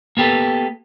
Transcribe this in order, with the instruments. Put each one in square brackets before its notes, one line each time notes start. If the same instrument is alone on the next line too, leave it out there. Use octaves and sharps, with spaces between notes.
[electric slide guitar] A#3 B3 G4 A4 B4